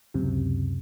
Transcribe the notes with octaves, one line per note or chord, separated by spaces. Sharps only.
C#2 F#2 C3